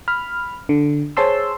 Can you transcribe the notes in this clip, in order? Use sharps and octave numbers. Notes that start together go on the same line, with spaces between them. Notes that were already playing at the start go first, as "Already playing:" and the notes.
B5 F6
D3
G#4 C5 C#5 A5 C6 E6